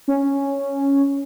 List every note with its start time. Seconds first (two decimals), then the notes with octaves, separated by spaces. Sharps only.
0.08 C#4